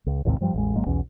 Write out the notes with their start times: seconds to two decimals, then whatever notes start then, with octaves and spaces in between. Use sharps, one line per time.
0.07 C#2
0.25 A1 D#2 G#2 C3
0.41 G2 F3 G3
0.54 A1 E2 G#3
0.75 G#1 F#3 G#3 A#3
0.86 B1 E2 C#4